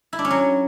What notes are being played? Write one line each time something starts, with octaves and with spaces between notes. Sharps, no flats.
E4
D4
C#4
F#3